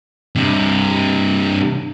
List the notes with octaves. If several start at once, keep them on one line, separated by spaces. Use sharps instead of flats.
G2 C3